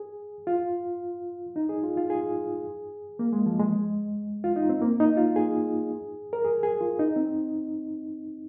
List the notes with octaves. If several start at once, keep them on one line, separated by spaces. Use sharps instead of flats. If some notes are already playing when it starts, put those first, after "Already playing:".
Already playing: G#4
F4
D#4
G#4
F4
F4
G#4
A#3
G#3
F3
G#3
F4
D#4
C4
A#3
D#4
F4
G#4
A#4
G#4
G#4
F4
D#4
C4